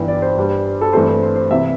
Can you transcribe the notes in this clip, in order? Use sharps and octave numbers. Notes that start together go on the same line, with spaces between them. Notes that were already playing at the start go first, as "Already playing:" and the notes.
Already playing: G1 G2 E3 G5
D5
C5
G2 G3 D4
A4
G2 E3 A3 C4 C5
C5
C5
C5
C3 E3 E5